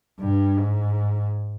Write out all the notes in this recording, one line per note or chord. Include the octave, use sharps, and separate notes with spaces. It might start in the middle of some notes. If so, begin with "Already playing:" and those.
G2
G#2